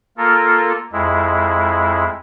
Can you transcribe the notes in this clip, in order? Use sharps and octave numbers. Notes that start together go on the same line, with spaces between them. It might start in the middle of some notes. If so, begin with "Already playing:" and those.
A#3 F4 A4 A#4
F2 G#3 E4